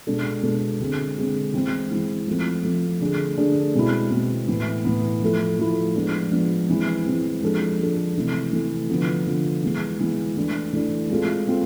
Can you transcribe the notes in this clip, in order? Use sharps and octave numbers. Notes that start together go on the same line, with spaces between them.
B2 G#3 D4 A4
B2 G#3 D4 A4
D3 G#3 C4 G#4
D3 G#3 C4 G#4
E3 G#3 C4 E4
E3 G#3 C4 E4
F3 A3 C4
F3 A3 C4
D3 A3 D4 G#4
D3 A3 D4 G#4
B2 G#3 C4 E4
B2 G#3 C4 E4
A2 E3 B3
A2 E3 B3
F3 A3 E4 A4
F3 A3 E4 A4
F3 G#3 B3 D4
F3 G#3 B3 D4
E3 G#3 C4
E3 G#3 C4
F3 G#3 D4 A4
F3 G#3 D4 A4
C3 E3 A3
C3 E3 A3
D3 F3 B3
D3 F3 B3
E3 G#3 B3
E3 G#3 B3
E3 A3 D4
E3 A3 D4
G#3 C4 F4 A4
G#3 C4 F4 A4